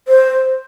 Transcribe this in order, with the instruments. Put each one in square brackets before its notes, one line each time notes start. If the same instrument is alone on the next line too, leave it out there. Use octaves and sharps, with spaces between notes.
[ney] C5